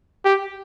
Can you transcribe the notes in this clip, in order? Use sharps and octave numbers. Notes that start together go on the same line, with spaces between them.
G4